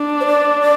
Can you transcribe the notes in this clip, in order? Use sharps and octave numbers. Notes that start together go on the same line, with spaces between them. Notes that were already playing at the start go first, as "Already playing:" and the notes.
Already playing: D4
C5
D5
D5